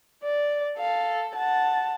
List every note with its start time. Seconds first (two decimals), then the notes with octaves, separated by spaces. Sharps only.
0.23 D5
0.78 A4 F5
1.35 F#5 A5